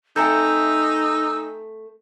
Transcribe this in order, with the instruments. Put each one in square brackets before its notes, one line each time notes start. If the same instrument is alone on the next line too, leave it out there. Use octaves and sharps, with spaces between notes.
[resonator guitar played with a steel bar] A3 C4 A4 [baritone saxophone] D#4 [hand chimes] G#5 A#5 G6 [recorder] E6